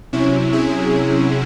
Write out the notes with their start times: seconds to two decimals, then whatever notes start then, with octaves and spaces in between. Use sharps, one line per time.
0.13 C3 F#3 C#4 E4
0.53 E4 G#4